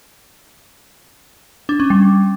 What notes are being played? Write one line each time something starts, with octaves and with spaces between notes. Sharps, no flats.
D4
C#4
G3